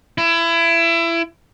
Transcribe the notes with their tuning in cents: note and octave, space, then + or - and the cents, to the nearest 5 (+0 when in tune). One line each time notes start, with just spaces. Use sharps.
E4 +25